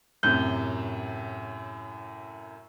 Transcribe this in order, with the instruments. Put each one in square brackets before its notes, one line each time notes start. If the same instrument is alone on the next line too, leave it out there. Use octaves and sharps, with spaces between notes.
[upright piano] F#2 A2 C3 [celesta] F#6 G6 G7